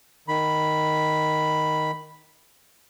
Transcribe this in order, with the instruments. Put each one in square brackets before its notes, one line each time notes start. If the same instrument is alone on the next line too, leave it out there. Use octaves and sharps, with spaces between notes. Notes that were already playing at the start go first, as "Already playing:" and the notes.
[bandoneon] D#3 B5